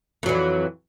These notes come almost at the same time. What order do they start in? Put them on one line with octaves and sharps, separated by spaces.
F2 F#3 E3